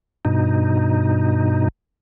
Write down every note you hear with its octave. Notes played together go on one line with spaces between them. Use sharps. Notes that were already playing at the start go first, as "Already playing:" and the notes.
G2 B2 D#4